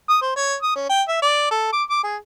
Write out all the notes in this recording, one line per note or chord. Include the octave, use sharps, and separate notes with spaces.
D#6
C5
C#5
D#6
C#4
G5
E5
D5
A4
D6
D6
G#4